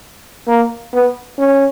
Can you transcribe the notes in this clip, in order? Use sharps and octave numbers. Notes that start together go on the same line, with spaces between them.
A#3
B3
C#4